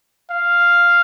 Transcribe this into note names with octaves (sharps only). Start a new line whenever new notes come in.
F5